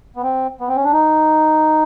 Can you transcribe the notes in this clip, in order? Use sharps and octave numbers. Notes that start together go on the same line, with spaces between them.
B3
C4
B3
C4
C#4
D4
D#4